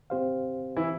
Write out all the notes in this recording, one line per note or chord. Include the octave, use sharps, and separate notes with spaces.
C4 G4 C5 F5
E3 E4